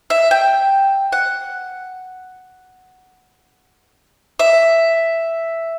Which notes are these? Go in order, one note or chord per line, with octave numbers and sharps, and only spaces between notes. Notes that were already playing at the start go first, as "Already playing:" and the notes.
E5
G5
F#5
E5